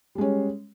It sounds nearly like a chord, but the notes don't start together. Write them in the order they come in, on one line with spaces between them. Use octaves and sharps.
G3 G#3 C#4